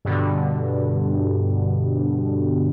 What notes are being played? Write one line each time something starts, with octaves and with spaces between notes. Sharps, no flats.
G2 B2 D3